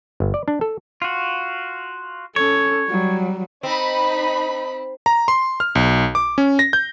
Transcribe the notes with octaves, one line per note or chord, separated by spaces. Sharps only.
G1
D5
D4
A4
F4 F#4
C#4 A4 C#5
F#3 G3
C4 D#4 B5
A#5
C6
F6
B1
D6
C#4
A#6
G6